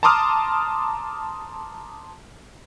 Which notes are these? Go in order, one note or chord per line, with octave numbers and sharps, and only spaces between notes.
A5 A#5 C6 D6 D#6 F6